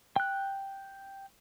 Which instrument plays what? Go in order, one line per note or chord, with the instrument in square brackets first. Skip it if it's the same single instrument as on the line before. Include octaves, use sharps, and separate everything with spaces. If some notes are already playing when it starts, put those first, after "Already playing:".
[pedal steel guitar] G5 F#6